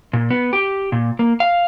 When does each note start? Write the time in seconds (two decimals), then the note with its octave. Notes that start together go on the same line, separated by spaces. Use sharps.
0.13 A#2
0.30 B3
0.53 G4
0.92 A#2
1.19 A#3
1.40 F5